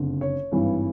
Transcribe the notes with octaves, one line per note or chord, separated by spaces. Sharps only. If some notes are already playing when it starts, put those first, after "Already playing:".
Already playing: F#1 F2 D3
C#5
G#1 G2 E3